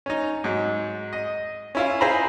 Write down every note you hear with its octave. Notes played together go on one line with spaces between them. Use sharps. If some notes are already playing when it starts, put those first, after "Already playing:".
C#4 D#4
G#2 F#3
D#5
C#4 E4 F4
F4 G#4 C5 G5 A#5 B5